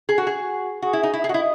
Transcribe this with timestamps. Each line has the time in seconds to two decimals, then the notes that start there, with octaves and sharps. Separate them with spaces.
0.09 G#4
0.18 F#4
0.27 G#4
0.41 F#4
0.82 F#4 G#4
0.93 E4
1.03 D#4
1.13 E4
1.24 G#4 D#5
1.29 F#4
1.34 E4